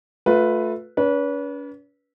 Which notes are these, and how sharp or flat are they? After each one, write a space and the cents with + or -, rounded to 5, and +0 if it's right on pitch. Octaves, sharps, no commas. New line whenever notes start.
A3 +0 F4 +30 B4 +0
C#4 +45 B4 -25